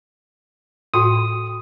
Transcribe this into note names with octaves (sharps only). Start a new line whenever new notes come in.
A2 F#4 G5 C6 D#6